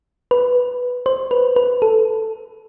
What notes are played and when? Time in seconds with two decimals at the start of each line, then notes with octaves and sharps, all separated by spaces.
0.31 B4
1.06 C5
1.31 B4
1.56 B4
1.82 A4